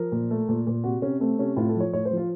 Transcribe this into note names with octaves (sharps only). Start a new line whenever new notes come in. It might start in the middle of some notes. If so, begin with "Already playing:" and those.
Already playing: F3 A#4
A#2
A3
A#2
A#2
C3 F#4
C3 C#4
A3 C4
C3 C#4
A2 F4
A4
F3
C#5
A2 C#5
C5
F3
F4